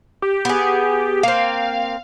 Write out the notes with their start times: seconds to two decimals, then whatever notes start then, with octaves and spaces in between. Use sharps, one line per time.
0.22 G4
0.45 B3 G#4
1.23 A#3 C4 F5